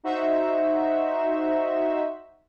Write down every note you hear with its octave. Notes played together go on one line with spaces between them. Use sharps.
D#4 F#4 C5 E5